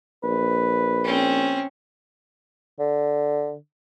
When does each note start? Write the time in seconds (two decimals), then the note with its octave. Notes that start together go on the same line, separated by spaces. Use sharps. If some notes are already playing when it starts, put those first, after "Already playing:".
0.24 A#1 B4
1.04 C4 C#4
2.79 D3